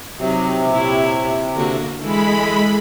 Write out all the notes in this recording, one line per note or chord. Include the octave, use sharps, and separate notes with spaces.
C3 F#3 D#4
A#2 E4 C#5
D3 A#3 F#4
E3 G#3 A4 B5